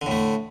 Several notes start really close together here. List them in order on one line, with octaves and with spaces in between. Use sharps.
D3 A2 A3